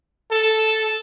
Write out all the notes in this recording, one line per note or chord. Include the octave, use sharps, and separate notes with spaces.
A4